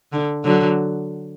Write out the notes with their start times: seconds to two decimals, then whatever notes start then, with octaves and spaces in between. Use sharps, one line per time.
0.12 D3
0.45 D3 F#3